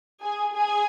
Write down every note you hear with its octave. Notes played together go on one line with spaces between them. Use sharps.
G#4 G#5
G#4 G#5